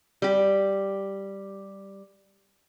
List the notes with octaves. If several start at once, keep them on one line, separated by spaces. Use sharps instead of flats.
G3 G4